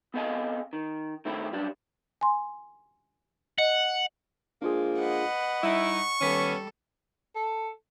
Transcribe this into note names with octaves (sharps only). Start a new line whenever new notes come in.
B3 C4 A4 D#5 F5 G#5
D#3
D#3 A3 C4 E4
F#2 G3 D4
G#5 C6
D#5 F#5
F3 G#3 A#3 D4 F4 G#4
B4 D#5 F#5
G3 D#4 E4 E5 C#6
D#3 G3 B3 C#4 A4 D6 B6
A4